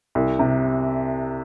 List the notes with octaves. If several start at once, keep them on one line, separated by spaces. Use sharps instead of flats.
C2
C3